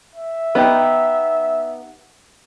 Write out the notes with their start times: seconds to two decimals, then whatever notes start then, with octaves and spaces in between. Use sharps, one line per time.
0.16 E5
0.55 B3 D#4 G4